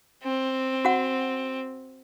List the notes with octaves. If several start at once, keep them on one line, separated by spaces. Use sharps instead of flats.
C4
F#4 F#5